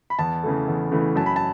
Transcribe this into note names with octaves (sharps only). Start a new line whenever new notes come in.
B5
E2 A5
C#3 E3 A3
E2
C#3 E3 A3
F#2 A5
B5
A5